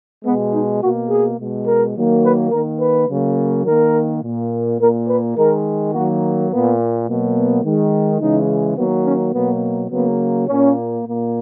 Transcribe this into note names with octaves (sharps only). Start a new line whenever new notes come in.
B2 G#3 B3
D#4
B2 A#3 F#4
G#4
B2 G#3
A#4
D#3 F#3 A#3
B4
D#3 A#3 A#4
B4
C#3 F#3 A#3
D#3 A#3 A#4
A#2 A#3
A#2 A#3 A#4
B4
D#3 G#3 A#4
D#3 F#3 A#3 F#4
A#2 A#3 B3
B2 F#3 A#3
B3
D#3 G#3
C#3 E3 G#3 D#4
D#3 F#3 A#3 B3
C#4
B2 F#3 A#3 B3
C#3 F#3 A#3 B3
A#2 A#3 C#4
A#2 A#3